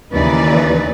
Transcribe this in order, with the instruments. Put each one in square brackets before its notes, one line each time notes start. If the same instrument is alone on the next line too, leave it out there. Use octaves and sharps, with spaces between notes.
[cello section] D#2 C#3 E3 D#4 B4 D5